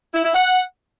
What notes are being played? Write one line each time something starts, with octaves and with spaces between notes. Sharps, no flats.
E4
E4
F#5